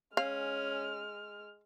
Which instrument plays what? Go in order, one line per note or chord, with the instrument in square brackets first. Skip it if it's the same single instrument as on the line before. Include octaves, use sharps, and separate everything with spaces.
[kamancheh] G#3 F6 [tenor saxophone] C#4 [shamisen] F5